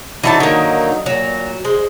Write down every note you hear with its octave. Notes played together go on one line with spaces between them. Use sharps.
D3 E3 F#3 D#4 A4 A5
D#3 A#3
A#2 F#3
G#3 C5